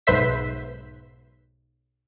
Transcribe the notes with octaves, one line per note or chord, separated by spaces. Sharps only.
B1 G#2 B4 C5 E5 B6